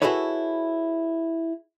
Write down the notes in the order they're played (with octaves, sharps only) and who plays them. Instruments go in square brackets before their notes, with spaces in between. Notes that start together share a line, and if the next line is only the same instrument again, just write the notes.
[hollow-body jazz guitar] E4 F#4 G#4 A4 B4 C#5